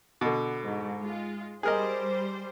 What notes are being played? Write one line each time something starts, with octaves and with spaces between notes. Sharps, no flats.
B2 D3
G#2
G#3 F4
G3 G#4 A#4 C5 D#5